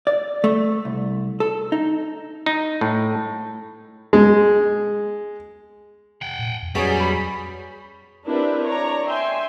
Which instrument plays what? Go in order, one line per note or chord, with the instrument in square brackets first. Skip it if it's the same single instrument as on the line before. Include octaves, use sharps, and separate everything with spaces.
[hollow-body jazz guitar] D5
A3
C2
A4
D#4
[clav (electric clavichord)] D#4
A2
[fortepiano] G#3
[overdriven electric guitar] F#5 G5
[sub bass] A#2
F2
[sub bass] F2 [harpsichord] B2 F#3 C#4 [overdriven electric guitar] G3 [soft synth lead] G#4
[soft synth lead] B5
[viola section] C4 D4 E4 G4 A#4 B4
C#5 D5 A#5
E5 G5 G#5 C6